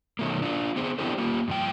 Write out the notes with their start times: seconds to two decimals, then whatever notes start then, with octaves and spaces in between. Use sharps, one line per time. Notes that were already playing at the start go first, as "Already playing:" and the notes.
0.19 B2 D#3 E3 F#3 A3 A#3
0.42 D4 F4
0.76 B3 C4 G#4
0.98 B3 D4 E4 G4 A4 C5
1.18 A#3 F4 G4
1.48 G2 F3 G5